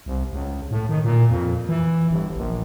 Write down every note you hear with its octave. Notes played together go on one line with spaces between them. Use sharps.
C2
C#2
A2
D#3
A#2
F2
E3
G1
A#1